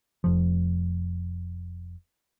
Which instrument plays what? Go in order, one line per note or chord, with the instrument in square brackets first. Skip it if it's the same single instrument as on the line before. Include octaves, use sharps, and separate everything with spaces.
[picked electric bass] F1 F3